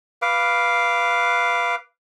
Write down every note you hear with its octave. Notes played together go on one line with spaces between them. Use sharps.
B4 F5 D6